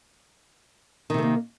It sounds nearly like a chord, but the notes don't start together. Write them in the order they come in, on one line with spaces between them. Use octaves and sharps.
D#3 C3 A3 A#3